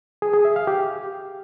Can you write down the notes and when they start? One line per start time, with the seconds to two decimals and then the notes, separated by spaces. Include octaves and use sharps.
0.22 G#4
0.33 G#4
0.45 E5
0.56 F5
0.67 G4